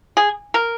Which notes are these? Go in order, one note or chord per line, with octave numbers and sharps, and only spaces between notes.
G#4
A#4